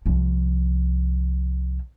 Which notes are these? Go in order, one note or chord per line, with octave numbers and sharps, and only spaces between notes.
C2 F3